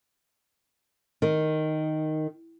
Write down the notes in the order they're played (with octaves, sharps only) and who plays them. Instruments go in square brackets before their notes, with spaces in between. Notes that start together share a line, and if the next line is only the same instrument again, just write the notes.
[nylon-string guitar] D#3